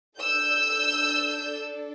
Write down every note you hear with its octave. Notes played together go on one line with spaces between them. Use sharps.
D4 A4 E6 G6